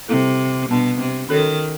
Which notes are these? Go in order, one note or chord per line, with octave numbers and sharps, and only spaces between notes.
C3 G3 C4 E4 A4
B2 G3 B3 D4
C3
D#3 C#4 F#4 A4 C#5